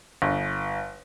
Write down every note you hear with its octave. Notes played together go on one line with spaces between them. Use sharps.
G1